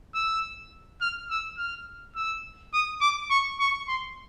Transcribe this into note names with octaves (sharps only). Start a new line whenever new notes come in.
E6
F6
E6
F6
E6
D#6
D6
C#6
C#6
C6